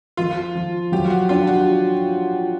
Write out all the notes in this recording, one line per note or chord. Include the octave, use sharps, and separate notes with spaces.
F3 F4
F3
F#3 G4
F#4
D4 F4
F#4